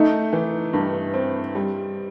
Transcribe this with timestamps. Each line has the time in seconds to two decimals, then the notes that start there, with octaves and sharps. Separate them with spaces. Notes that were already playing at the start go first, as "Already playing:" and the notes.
Already playing: A3 D#4
0.33 E3
0.73 G2
1.14 C4
1.55 G3